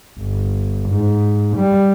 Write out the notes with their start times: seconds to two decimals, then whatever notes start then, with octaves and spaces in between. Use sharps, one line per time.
0.19 G1
0.90 G#2
1.57 G3